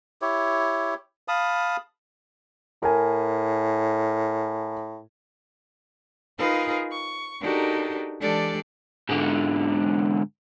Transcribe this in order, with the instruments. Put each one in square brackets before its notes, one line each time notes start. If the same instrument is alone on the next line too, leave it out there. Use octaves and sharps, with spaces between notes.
[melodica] E4 G4 C#5
F5 A5 B5 D#6
[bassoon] A2 [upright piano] A#4 G#5
[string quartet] D#4 F4 G#4 A#4 B4 F5
C#6
D4 D#4 F#4 G4 A4 A#4
E3 G#3 D4 G4 A4 D5
[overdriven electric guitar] G#2 D3